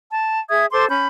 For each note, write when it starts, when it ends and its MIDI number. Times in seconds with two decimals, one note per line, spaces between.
0.11 0.39 81
0.49 0.66 68
0.49 0.66 76
0.49 0.66 87
0.49 0.66 92
0.72 0.86 69
0.72 0.86 72
0.72 0.86 84
0.72 0.86 86
0.89 1.06 61
0.89 1.06 83
0.89 1.06 91